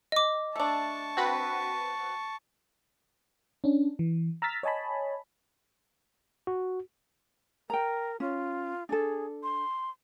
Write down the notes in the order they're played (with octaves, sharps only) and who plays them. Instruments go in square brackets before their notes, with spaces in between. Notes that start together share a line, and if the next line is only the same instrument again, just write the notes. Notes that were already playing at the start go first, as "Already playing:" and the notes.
[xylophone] D#5 D6
[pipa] A3 D4 [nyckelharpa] A5 C#6
[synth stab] C4 F#4 B4
[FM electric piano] C#4 D4
E3
A#5 E6 F6 A6 B6
C#5 D#5 G#5 A5 B5
[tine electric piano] F#4
[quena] A#4 [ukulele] G5 A#5
[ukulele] C#4 [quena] F4
[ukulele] D4 A4 [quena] G#4
[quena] C6